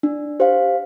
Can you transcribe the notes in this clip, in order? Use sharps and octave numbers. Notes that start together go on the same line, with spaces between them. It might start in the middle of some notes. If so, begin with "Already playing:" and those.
D4
G4 C5 F5